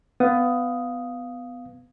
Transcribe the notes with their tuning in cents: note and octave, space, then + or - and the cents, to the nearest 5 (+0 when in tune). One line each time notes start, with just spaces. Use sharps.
B3 +20 F5 +0 D#6 +0